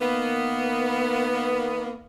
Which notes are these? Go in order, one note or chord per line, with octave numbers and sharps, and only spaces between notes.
D#3 A#3 B3